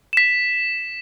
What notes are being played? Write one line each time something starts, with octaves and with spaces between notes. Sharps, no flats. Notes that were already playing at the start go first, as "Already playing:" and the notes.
B6 E7